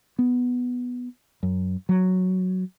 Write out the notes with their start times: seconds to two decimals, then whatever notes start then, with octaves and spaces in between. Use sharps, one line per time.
0.19 B3
1.43 F#2
1.89 F#3